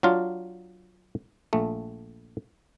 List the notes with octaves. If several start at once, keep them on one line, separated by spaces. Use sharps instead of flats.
F#3 D4 F4
A#1 A3